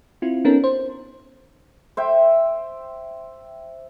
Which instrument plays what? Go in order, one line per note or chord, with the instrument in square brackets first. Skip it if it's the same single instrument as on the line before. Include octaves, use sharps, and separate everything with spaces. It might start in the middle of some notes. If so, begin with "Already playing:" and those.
[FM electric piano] C4 E4 F4
B3 C#4 D#4 A4 A#4
C5
[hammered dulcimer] C5 E5 G5